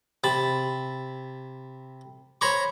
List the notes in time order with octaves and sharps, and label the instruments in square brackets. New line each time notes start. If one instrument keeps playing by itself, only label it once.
[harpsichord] C3 A5 B5
C5 C#5 A#5 B5 C#6